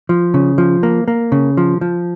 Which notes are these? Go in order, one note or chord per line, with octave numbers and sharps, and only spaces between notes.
F3
C#3
F3
A#3
A#3
C#3
F3
F3